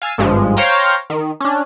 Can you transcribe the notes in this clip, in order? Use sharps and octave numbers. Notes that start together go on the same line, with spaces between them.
F5 G#5 E6 A6
G#1 G2 F3 G#3
C5 C#5 F5 G5 A#5
D#3
C#4 D4